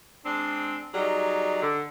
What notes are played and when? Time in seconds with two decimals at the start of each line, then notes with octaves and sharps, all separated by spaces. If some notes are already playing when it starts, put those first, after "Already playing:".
0.24 G#3 C4 D4
0.93 F#3 G3 D#4 G#4
1.62 D3